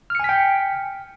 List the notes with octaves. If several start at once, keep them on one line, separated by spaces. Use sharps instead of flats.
G5 G#5 F6 B6 C#7